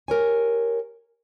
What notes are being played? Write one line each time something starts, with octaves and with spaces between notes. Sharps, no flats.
G4 A#4 C#5 G#5